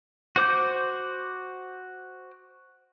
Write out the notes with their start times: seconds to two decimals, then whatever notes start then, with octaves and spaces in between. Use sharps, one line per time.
0.36 F#4 C5 D6 G6